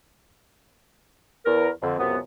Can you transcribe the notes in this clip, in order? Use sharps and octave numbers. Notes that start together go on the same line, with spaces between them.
E2 A#4
F2 D3
C#2 F#2 C3 B3